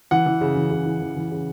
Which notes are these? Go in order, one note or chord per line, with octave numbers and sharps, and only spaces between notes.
E3 F#5
E3
C#3
E3
C#3
E3
E3
E3
C#3